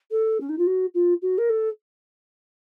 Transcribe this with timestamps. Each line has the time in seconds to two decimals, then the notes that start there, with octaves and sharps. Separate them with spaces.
0.11 A4
0.41 C#4
0.49 D#4
0.58 F4
0.67 F#4
0.95 F4
1.22 F#4
1.38 A#4
1.50 A4